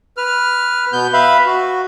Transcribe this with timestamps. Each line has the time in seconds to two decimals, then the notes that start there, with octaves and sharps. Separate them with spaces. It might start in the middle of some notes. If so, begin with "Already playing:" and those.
0.17 B4 F6
0.93 B2 B3 G6
1.13 B4 E5 F5 B5
1.46 F#4